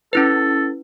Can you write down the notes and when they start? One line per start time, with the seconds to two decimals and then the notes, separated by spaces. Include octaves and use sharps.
0.13 C#4 E4 A4 B4